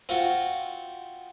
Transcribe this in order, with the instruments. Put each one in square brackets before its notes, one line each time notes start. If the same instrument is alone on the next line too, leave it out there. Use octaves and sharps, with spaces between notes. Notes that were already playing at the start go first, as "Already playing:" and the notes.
[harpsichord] C4 F4 F#4